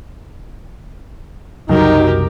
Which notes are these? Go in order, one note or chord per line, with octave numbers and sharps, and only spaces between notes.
F#1 C2 F#3 D#4 G4 A#4